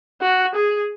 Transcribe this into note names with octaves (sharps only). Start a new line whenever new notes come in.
F#4
G#4